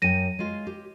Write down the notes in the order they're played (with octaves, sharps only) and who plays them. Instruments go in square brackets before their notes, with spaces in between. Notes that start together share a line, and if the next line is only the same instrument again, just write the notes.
[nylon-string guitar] F#2 G5 [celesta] A#6 D#7
[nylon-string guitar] G#3 F4
G4